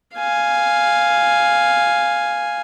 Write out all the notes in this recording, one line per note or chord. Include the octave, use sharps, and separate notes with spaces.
F5 G#5